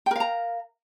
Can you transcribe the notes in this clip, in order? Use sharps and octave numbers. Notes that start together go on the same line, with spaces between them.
A#4 F5 G5 A#5